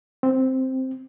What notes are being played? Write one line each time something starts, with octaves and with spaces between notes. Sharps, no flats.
C4